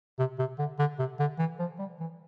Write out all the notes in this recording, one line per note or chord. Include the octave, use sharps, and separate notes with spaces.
C3
C3
D3
D3
C3
D3
E3
F3
G3
E3